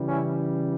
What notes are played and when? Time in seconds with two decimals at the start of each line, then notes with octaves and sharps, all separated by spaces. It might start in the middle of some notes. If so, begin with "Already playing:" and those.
Already playing: C#3 E3 G3
0.08 C#4 E4